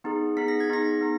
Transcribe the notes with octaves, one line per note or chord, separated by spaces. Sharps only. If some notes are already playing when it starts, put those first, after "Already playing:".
B3 D#4 G#4
B3 D#4 G#4 B6
A#6
G#6
B3 D#4 G#4 A#6
B3 D#4